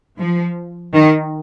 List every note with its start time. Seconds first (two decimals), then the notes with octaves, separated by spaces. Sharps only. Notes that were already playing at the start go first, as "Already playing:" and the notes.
0.18 F3
0.94 D#3